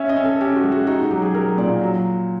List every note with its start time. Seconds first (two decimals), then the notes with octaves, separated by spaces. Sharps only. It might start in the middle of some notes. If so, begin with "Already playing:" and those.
Already playing: C#4 E5
0.09 D#5
0.16 C#4
0.25 A4
0.40 C#4 G4
0.56 F#4
0.64 G#3
0.72 F#4
0.87 D#4 F#4
0.99 F#4
1.11 F#3 G4
1.22 G#4
1.34 F#3 A#4
1.58 A#2 D5
1.81 F#3